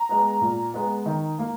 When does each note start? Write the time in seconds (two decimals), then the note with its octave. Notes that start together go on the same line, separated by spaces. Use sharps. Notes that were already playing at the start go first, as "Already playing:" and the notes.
Already playing: A#5
0.09 G#3 B3
0.41 A#2
0.74 G#3 B3
1.06 D#3
1.39 A#3